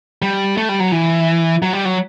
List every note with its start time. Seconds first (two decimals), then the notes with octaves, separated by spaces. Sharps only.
0.22 G3
0.57 A3
0.69 G3
0.80 F#3
0.92 E3
1.63 F#3
1.73 G3
1.85 F#3